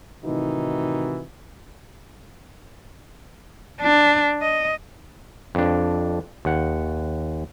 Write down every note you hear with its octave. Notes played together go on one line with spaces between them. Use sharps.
A2 C3 D#3 E3 D#4 F#4
D4
D#5
F2 D4
D#2 F#5